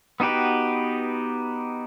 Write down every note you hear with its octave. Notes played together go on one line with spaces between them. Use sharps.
B3 D#4 F#4 G4 B4